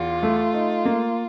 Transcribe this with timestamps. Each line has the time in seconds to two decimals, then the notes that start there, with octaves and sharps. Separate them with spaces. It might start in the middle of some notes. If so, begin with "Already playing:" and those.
Already playing: E2 F4
0.23 A3
0.54 D#4
0.85 A#3